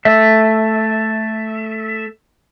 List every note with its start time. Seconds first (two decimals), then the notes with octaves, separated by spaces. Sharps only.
0.05 A3 E5